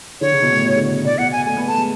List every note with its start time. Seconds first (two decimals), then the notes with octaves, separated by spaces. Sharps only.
0.21 D3 C#5
0.32 C#3
0.42 B2
0.52 A2
0.63 B2
0.77 D3
0.91 C#3
1.04 B2 D5
1.18 B2 F#5
1.32 G#5
1.46 A3 G#5
1.57 B3
1.67 A3 A5
1.77 G#3